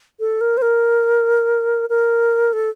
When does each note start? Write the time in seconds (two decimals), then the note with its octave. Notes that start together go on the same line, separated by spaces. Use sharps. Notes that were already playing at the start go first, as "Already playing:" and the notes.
0.20 A4
0.41 A#4
0.57 C5
0.62 A#4
1.89 A#4
2.53 A4